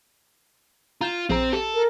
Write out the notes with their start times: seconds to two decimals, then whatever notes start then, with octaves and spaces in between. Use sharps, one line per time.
1.01 F4 A#5 G6 E7
1.30 A#1 C4 G#4 A#5
1.53 G4 A4
1.73 A#4